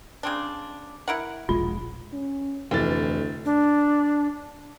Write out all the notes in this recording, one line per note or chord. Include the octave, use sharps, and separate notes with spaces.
C#3 C4 D4
E4 A#4 F#5
E1 A#1 G#3 F4
C#4
F1 D2 E3 A6
D4